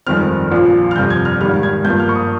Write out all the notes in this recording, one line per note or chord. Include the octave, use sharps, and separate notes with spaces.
G1 F2 D#3 G#3 C4 F6
A#1 A#2 F3
F6
G1 F2 C3 G6
G#6
F6
G#1 G#2 D#3 G3 F6
G#6
G2 F3 A#3 G6
F6
C#6
D#6